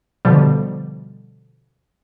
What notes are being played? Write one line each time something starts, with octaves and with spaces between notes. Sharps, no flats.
B2 D3 F3 G3